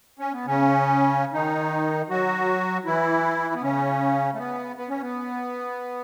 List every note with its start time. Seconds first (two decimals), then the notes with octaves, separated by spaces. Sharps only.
0.19 C#4
0.33 B3
0.46 C#3 C#4
1.33 D#3 D#4
2.10 F#3 F#4
2.86 E3 E4
3.54 B3
3.62 C#3 C#4
4.33 A3
4.38 B3
4.76 B3
4.89 C#4
5.01 B3